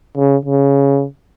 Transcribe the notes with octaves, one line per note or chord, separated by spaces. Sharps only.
C#3
C#3